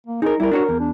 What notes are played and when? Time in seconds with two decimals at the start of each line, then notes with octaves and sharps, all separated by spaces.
0.07 A#3
0.22 D#4 G#4 A#4
0.40 G3 E4 A#4
0.51 D4 F#4 A#4 C#5
0.69 E2
0.80 D4